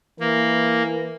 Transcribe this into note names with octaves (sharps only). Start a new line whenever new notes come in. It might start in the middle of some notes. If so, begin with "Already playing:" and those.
E3 A#3